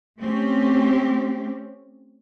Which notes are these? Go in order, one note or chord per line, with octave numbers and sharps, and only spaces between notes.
A3 C4 C#4 G4